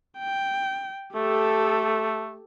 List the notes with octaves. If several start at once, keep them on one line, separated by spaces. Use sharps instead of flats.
G5
A3 G4 A4